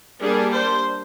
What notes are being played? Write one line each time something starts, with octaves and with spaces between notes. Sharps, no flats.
G3 A#3 D4 G#4
C5